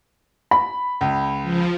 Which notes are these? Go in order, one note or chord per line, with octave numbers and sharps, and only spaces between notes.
B5
C#2
F3